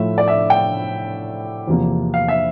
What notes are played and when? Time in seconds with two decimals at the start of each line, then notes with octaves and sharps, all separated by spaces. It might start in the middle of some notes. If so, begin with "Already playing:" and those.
Already playing: A2 F3 A3 E5
0.18 D5
0.28 E5
0.50 G5
1.67 E2 C3 F3 A#3
2.14 F5
2.28 E5